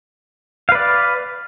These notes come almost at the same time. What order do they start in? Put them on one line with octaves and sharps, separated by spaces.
F5 B4 D5